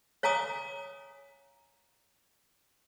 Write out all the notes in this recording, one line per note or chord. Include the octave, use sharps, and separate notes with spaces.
C#5 F5 G#5 A#5 D6 D#6